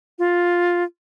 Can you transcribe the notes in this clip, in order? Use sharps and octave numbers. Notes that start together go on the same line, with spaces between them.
F4